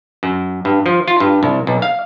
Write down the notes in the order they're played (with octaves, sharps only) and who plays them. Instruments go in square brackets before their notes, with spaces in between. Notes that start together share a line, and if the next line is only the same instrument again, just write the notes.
[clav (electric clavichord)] F#2
G2
F3
F4
G2
C2
B1
F5